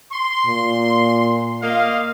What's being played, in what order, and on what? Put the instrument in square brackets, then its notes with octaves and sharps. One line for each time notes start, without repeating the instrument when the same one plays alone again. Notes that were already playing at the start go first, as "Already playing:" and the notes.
[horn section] C6
[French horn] A#2
[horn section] A#3 D#5 F5